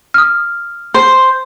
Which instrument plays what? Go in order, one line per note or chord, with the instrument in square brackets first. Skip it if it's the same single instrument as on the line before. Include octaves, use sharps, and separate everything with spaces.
[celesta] D#6 F6
[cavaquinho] C5